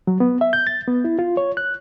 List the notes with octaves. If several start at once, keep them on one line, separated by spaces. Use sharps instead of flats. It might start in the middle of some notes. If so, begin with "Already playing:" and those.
F#3
B3
E5
G6
A6
B3
E4
F4
C#5
F#6